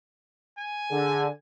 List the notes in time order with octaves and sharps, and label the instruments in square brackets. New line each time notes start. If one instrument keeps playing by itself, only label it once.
[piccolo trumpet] G#5
[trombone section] D3 [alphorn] G#4